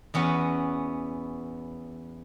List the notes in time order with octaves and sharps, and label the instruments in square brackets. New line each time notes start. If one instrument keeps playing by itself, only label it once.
[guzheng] E2 B3 C#4 F#4